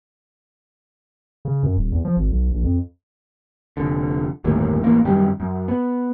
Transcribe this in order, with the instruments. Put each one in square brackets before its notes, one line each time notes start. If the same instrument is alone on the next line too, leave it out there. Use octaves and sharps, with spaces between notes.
[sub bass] C#3
F#2
D#1
E2
F3
G#1
B1
A#1
F2
[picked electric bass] F1 D3
G1 D#2 A2 D#3
A1 E2 A#3
F#2 D#3 G3
F#2
B3